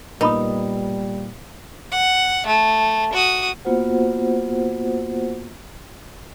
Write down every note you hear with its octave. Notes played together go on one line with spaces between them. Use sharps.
A#2 G3 B3 D#4 A#4 B5 D#6
F#5
A3
F#4 D#6
A#3 B3 F4 F#4 C5 F#5